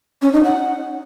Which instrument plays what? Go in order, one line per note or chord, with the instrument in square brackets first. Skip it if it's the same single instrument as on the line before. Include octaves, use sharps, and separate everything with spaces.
[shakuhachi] C#4
D#4
F#5